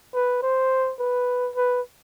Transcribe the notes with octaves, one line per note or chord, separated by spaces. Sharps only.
B4
C5
B4
B4